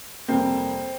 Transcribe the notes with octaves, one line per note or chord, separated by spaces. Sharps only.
F2 C3 G3 A#3 C4